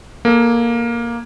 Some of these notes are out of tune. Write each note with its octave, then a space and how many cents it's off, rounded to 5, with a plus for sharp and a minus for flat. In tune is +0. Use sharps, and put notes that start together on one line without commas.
A#3 +10 A4 +0